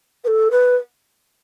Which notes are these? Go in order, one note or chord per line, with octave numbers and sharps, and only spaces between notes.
B4
A4
B4